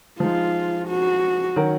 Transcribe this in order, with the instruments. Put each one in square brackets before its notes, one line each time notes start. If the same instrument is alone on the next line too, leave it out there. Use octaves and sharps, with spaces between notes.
[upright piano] F3 G#3 D#4 [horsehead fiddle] F4
[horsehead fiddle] F#4
[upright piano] D#3 F#3 C#4 F#4 A#4